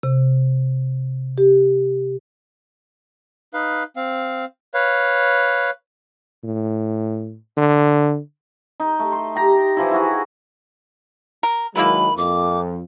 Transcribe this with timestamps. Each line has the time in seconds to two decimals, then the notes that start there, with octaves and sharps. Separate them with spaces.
0.03 C3
1.38 G4
3.54 D#4 B4 F5
3.96 C4 F5
4.74 B4 C#5 F5
6.44 A2
7.58 D3
8.80 D#4
8.99 A3
9.12 C6
9.36 G4 A#5
9.77 E3 F3 E4
9.91 E4 F#4 G#4
11.43 A#4
11.76 D#3 F#3 G#3 A#3 E4 B4 B5
12.17 F2 D6